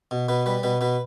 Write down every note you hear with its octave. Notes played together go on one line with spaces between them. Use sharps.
B2
B2 B4
G3 B4
B2 B4
B2 B4